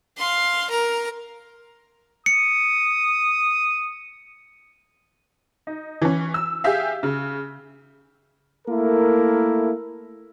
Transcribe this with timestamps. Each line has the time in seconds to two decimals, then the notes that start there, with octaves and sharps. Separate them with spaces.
0.18 F5 C6
0.70 A#4 A#5
2.26 D#6 C#7
5.67 D#4
6.02 E3 C#4
6.34 E6
6.64 G4 G#4 E5 F5
7.03 C#3
8.67 A3 A#3 E4 A4 A#4